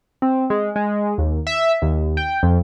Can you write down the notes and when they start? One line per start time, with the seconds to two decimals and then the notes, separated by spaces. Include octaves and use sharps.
0.22 C4
0.50 G#3
0.76 G#3
1.18 D#2
1.47 E5
1.82 D#2
2.17 G5
2.43 F2